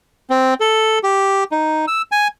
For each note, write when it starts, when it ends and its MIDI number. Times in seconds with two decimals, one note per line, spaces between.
0.30 0.54 60
0.60 0.99 69
1.03 1.44 67
1.52 1.85 63
1.88 2.02 88
2.12 2.28 80